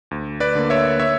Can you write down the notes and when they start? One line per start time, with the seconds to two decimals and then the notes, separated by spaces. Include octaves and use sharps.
0.11 D2
0.40 B4 D5
0.55 D3 A#3
0.70 C#5 E5
0.99 C#5 E5